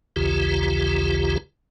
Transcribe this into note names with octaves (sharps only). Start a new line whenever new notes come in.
A#1 D#2 C#3 E3 F4 G4